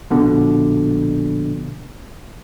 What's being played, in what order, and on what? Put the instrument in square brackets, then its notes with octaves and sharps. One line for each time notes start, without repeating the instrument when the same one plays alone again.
[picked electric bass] A#1 B2 D3